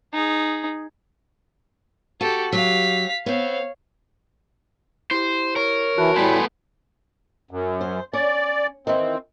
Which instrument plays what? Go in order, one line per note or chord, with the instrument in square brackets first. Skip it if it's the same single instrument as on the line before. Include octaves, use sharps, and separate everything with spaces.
[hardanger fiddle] D#4 G#4
[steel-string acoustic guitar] F#4 [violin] G4 A4
[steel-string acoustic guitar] F#3 G4 [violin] F5 B6
[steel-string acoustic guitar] B3 C4 [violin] C#5 F5
[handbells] E4 G4 [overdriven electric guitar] C5
[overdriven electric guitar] A#4 [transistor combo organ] C#5
[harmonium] E3 E4 [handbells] F#4 A5 F#6
[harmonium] A2 G3 [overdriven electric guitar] A3 B3 [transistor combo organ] G#5 B5 C6 [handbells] D7
[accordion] F#2
[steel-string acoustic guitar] C5
[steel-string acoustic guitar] C#4 [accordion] D5
[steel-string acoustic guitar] D#3 E3 [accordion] C4